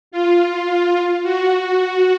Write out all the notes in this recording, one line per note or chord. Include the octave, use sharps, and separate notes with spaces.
F4
F#4